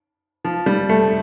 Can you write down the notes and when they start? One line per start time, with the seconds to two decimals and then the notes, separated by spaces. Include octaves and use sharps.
0.45 F3
0.66 G3
0.89 A3